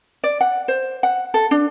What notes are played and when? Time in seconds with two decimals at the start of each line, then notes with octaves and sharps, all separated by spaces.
0.24 D5
0.41 F#5
0.68 C5
1.03 F#5
1.34 A4
1.51 D4